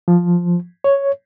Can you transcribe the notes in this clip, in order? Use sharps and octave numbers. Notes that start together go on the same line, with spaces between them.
F3
C#5